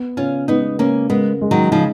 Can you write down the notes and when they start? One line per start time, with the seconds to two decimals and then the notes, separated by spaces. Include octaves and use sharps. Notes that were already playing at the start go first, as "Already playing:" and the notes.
Already playing: B3
0.17 C#3 C#4 F4
0.48 G#3 B3 D#4
0.79 C#3 A#3 C#4
1.10 G#3 B3 A#4
1.41 G#3
1.51 D#3 F#3
1.71 C#3 F3 D#4